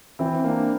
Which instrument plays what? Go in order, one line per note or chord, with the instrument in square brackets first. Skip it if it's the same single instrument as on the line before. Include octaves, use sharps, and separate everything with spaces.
[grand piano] E3 [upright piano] C4 E4
[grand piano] A#3 D4